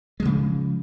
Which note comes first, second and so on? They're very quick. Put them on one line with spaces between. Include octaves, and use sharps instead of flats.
G#3 F3 C#3